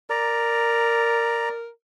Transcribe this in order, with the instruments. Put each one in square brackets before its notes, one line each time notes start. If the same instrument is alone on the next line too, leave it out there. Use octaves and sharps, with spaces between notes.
[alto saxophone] A#4 [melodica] D5 A#5